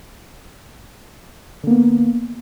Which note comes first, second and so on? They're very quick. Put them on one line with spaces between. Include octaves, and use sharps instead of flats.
D3 A#3 B3